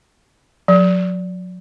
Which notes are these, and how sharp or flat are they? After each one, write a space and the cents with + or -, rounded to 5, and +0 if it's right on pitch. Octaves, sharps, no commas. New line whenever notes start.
F#3 -35